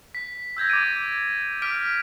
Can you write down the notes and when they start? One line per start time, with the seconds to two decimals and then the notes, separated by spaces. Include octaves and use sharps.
0.15 B6
0.57 E6 G6 G#6 A#6
0.70 D6 A6 D7 D#7
1.62 D6 F6 B6 D7